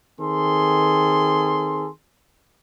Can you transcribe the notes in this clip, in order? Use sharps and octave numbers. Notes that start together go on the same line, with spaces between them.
D#3 C4 G#4 A4 C6